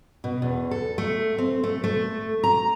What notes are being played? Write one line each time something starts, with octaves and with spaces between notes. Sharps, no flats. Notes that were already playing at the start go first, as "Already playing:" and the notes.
B2
E2
A4
A3
C4
A3
A3
A#5